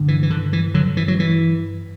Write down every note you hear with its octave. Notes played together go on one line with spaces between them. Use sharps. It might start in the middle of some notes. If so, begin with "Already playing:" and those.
Already playing: G2 D3
E3
E3
D3
E3
D3 F#3
E3
F#3
E3